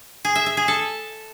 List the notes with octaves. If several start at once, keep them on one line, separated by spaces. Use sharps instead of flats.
G#4
E5
E5
G#4
A4